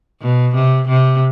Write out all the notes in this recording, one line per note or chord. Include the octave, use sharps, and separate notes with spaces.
B2
C3
C3